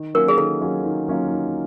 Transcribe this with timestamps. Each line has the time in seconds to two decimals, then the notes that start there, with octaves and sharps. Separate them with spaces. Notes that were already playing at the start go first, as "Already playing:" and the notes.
Already playing: D#3
0.14 F#3 A#3 C#4 F4 A#4
0.28 G#4
0.37 D#3 A4
0.61 F#3 A#3 C#4 F4
0.84 D#3
1.08 F#3 A#3 C#4 F4
1.31 D#3